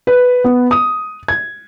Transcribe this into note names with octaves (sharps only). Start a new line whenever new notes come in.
B4
B3
D#6
G#6